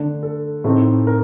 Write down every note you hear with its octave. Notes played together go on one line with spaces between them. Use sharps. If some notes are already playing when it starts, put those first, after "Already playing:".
Already playing: D3 A3 D4
A4
A2 A3 C4 D#4
A#4